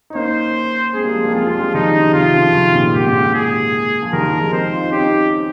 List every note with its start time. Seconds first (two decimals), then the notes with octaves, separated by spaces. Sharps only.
0.10 D#4
0.15 A#3 C#4 C5
0.94 G#3 C4 G#4
1.04 G3 A#3
1.14 F3 G#3
1.25 G3 A#3
1.34 G#3 C4 F4
1.47 F3 G#3
1.55 G3
1.61 F3 G#3
1.74 D#3 G3 D#4
1.94 C#3 F3
2.06 C#3
2.13 C3 D#3 F4
2.34 C#3 F3
2.53 C3 D#3
2.74 A#2 C#3
2.89 A#2
2.93 G#2 C3 G4
3.07 A#2 C#3
3.20 A#2 C#3
3.34 G#4
4.02 F3
4.13 D#3 G3 A#4
4.20 F3
4.26 D#3 G3
4.39 F3 G#3
4.53 C4 D#4 C5
4.73 F4
4.81 D#4
4.90 C#4 G4
4.98 C4 D#4